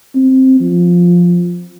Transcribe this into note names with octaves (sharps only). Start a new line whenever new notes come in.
C4
F3